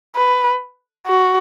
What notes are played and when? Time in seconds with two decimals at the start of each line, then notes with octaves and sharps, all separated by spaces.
0.16 B4
1.06 F#4